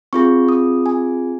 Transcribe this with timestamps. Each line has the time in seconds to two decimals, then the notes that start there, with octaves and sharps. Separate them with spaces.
0.13 C4 F4 G#4 C#6
0.49 D#6
0.86 G#5